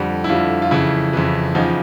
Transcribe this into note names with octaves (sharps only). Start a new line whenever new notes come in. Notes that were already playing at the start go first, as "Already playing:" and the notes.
Already playing: F2 D3 G3
E4
F2 D3 G3 F4
F4
F2 C#3 E3 E4
F2 C#3 E3
E2 C#3 F3 D#4